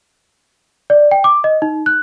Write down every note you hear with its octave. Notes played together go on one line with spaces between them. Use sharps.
D5
G5
D6
D#5
D#4
F#6